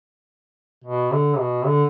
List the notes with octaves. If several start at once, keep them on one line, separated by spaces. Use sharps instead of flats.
B2
D3
B2
D3